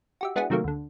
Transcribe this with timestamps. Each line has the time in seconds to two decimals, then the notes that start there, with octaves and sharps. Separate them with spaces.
0.21 F#4 G4 E5
0.36 G#3 B3 D4 E4 F#4 G#4
0.50 C3 D#3 F#3 A3 A#3
0.64 D2 D3